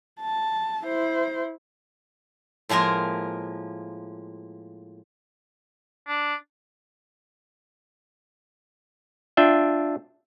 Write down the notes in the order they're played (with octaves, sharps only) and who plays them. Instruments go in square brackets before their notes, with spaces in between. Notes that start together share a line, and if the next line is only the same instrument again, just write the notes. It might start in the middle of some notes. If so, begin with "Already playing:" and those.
[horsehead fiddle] A5
E4 C5
[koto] A2 F3 G#3 A#3 A#4
[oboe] D4
[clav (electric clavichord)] D4 F4 E5 G5